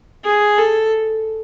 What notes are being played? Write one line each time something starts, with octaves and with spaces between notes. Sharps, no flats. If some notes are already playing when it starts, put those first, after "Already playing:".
G#4
A4